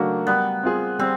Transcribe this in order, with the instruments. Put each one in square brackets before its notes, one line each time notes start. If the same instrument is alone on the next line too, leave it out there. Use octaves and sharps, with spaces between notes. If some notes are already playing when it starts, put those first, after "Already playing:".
Already playing: [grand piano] C#3 F#3 A3 D4 F#4 [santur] A#3
[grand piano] G3 [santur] B3
[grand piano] C4 F4 G#4
[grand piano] G3 [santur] C4